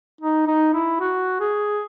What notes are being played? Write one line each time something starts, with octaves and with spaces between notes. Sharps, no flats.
D#4
D#4
E4
F#4
G#4